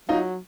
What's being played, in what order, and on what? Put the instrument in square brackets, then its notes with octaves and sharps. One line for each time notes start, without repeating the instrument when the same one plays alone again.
[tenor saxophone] F#3 [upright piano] D#4 F4